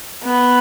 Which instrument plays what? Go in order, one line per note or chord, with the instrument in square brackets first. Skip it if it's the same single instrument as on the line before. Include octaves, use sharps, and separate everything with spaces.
[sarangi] B3